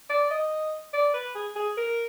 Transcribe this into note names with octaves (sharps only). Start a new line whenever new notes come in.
D5
D#5
D5
B4
G#4
G#4
A#4